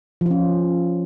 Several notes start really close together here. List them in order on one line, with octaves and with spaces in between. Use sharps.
F3 F4 C#4